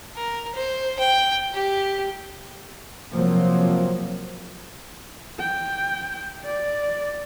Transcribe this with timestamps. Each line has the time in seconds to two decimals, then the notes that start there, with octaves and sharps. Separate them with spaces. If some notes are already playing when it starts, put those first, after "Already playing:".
0.16 A#4
0.55 C5
0.99 G5
1.54 G4
3.14 C3 F3 F#3 A#3 C4
5.39 G5
6.45 D5